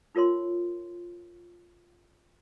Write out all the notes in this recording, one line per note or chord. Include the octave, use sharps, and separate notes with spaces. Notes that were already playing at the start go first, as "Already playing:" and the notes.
D#4 F4 A#4 C#5 C6